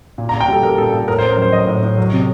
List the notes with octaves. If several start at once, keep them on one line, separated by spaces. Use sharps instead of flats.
A#2
A#5
A#2
G5
G3 A4
G3 A#4
A#2 A4
A#2 A4
A2 A#4
C5
A2
A#4
F#3 C5
F#3 D#5
A2
A2
F#3
C3